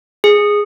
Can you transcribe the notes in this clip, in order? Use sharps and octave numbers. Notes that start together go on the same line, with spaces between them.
G#4